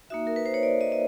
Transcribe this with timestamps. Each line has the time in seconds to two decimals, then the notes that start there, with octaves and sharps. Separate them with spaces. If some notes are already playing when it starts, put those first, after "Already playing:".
0.10 A#3 D#4 F#4 E5
0.27 A#4
0.36 B4
0.46 C5
0.54 C#5
0.63 D5
0.81 D#5
0.92 D#5